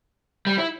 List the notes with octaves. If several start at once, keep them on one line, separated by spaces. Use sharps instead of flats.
G3
E4